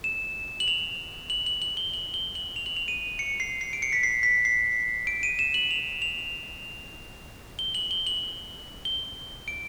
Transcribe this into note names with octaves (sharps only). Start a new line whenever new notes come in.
E7
F#7
F7
F#7
F#7
F#7
G7
F#7
G7
F#7
F7
F#7
F7
D#7
C#7
C7
C7
D7
C#7
B6
C7
B6
C7
D7
D#7
E7
F#7
F7
F7
G7
F#7
G7
F#7
G7
D7